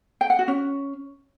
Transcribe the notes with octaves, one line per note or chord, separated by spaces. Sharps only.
G5
F#5
F#4
C#4